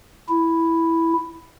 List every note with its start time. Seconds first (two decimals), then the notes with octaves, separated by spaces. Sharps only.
0.29 E4